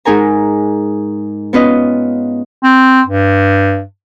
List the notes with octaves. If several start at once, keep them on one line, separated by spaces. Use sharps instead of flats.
G#2 D#4 A#4 G#5 A#5
B3 C#4 F4 B4 D#5
C4
G2